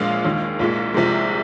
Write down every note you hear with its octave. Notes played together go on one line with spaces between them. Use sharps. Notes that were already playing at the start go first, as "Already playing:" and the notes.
Already playing: A#1 A#2 F3 G#3 F5
D#2 D#3 G#3
C2 A#2 G#3
C2 C3 F3 G#3